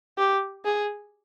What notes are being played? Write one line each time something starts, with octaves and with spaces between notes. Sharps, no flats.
G4
G#4